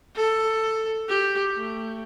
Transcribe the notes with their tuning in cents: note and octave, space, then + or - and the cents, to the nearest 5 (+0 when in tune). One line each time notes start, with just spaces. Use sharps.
A4 +10
G4 +5
A3 +25